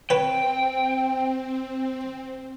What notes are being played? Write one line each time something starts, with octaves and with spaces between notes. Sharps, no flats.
C4 B4 C#5 G5